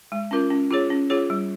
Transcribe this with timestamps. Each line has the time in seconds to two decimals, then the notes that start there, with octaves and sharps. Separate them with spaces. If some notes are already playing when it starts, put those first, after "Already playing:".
0.12 G#3
0.31 C#4 F4 A#4
0.50 C#4
0.70 F4 G#4 C#5
0.90 C#4
1.10 F4 G#4 C#5
1.30 G3